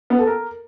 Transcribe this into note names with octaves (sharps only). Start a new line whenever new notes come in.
B3
A4
A#4